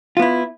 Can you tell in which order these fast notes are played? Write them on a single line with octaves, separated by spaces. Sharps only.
F4 B3 E4